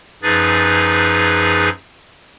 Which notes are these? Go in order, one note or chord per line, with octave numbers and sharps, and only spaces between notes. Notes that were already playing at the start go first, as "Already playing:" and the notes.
F#2 F3 D#4 G#4 B4 A6